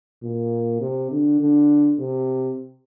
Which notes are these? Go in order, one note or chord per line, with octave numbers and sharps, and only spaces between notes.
A#2
C3
D3
D3
C3